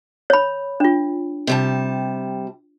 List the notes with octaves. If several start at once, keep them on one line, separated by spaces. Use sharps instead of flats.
C#5 B5
D4 F4
C3 G3 A5